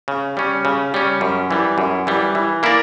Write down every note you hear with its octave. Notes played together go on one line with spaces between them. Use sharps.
C#3
G3 C#4
C#3
G3 C#4
F#2
E3 G3
F#2
E3 G3
E3
A#3 E4 A#4 D5